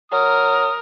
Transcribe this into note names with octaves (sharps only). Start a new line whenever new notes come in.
F#3 A#4 D#6